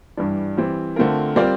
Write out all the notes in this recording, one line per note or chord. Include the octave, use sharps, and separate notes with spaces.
G2 E3 G3 D4
E3 G3 C4
D3 A3 C4 F4 A#4
G3 C4 F4 A#4 D5